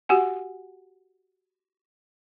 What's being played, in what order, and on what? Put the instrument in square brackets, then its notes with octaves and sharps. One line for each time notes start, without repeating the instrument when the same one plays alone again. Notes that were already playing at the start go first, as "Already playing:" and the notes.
[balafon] F#4 G4 F#5 G#5